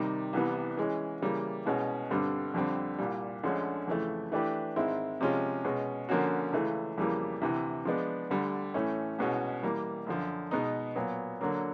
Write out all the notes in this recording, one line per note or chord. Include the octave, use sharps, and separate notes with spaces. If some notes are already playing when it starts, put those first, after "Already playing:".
Already playing: C3 D#3 G3
C2 C3 E3 G3 B3
E3 G#3 C#4
C#3 E3 G3 A#3
C2 B2 G#3 C#4
G2 D3 G3 C4
F2 D3 G3 C4
C2 A#2 G3
D2 D3 F3 G#3 C#4
F2 C#3 E3 A3
E3 A3 D4 G4 B4
G#2 D#3 G#3 C4 E4
C3 F3 G#3 C#4 F4
B2 G#3 C#4
D3 F3 A#3 C#4 F#4
C#2 C#3 E3 A3
F2 C#3 E3 G3 A#3
D2 C3 E3
F3 G#3 B3 D4
D2 D3 G3
A2 E3 A3 C#4
C2 B2 G#3 C#4 F#4
E3 G3 A#3
F#2 D3 F3
B2 G#3 B3 D#4
A#2 F#3 B3
D3 F#3 A#3